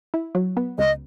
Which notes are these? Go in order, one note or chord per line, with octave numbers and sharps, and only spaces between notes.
E4
F#3
B3
C#2 D#5